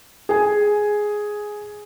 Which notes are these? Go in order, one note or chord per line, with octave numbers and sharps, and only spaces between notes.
G#4 G#5